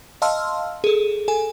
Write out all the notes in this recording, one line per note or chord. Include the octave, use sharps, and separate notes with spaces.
D#5 F5 A5 C6 E6 F6
G#4 A4
A4 G#5